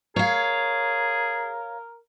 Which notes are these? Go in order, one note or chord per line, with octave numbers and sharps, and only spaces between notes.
G#4 A#4 C#5 F5